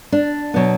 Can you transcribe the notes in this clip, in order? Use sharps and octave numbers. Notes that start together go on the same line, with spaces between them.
D4
B2 F#3 B3